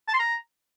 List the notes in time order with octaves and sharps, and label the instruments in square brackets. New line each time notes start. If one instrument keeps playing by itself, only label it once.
[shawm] A5
C6
A#5